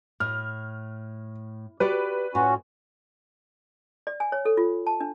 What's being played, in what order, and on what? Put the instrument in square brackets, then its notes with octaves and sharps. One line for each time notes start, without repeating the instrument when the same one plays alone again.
[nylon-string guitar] A2 [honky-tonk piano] F6
[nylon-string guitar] F#4 G4 D5 [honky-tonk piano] B4
[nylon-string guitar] A2 F4 [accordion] C#4 F#4
[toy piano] D5
G#5
C#5
A4
F4
A5
D4